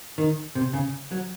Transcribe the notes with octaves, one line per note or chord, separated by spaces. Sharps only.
D#3
C3
C#3
F#3